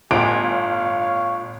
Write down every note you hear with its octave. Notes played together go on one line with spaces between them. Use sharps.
G1 A2 F4 G4 D#5 G#5 D7
C#5 F5